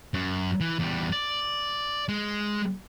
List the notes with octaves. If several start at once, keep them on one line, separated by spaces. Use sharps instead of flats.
F#2
E3
E2 G3
D5
G#3